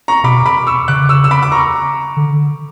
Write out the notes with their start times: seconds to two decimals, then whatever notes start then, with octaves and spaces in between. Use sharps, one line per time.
0.08 A#5 C#6
0.24 B2 B5 D6
0.46 B5 D6
0.67 C#6 E6
0.88 C#3 D6 F#6
1.09 C#6 E6
1.24 E6
1.31 B5 D6
1.43 D6
1.52 A#5 C#6
2.17 D3